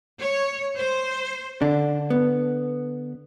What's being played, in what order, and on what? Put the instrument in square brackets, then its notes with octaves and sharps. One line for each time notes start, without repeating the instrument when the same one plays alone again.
[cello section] C#5
C5
[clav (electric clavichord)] D3 [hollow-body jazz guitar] D4
[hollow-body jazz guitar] B3